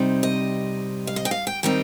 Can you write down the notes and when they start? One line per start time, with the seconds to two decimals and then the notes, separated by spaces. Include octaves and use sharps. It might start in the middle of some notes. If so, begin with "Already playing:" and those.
Already playing: C3 G3 C4 D#4
0.23 D#5
1.07 F5
1.16 D#5
1.25 G5
1.31 F5
1.47 G5
1.63 D#3 G3 C4 D#4 G5